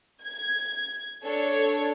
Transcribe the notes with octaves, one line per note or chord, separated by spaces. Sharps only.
G#6
D4 A4 C#5